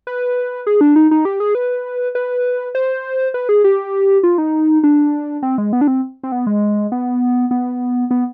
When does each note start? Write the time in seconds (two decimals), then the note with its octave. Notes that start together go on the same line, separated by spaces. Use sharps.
0.07 B4
0.67 G#4
0.81 D4
0.96 D#4
1.11 D#4
1.25 G4
1.40 G#4
1.55 B4
2.15 B4
2.75 C5
3.34 B4
3.49 G#4
3.64 G4
4.23 F4
4.38 D#4
4.84 D4
5.43 C4
5.58 G#3
5.73 B3
5.81 D4
5.88 C4
6.23 C4
6.32 B3
6.47 G#3
6.92 B3
7.51 B3
8.11 B3